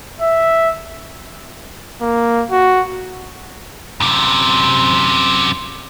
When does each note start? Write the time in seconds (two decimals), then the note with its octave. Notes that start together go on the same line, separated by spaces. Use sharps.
0.20 E5
2.01 A#3
2.51 F#4
4.00 F#2 C3